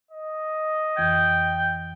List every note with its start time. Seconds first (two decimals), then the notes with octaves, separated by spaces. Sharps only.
0.11 D#5
0.97 F2 E3 G5 G#6